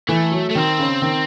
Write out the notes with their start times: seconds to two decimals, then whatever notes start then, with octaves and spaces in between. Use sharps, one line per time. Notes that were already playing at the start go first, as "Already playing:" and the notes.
0.09 E3 A3
0.32 F#3
0.50 A3
0.55 D#3 C4
0.79 C#3
1.02 D#3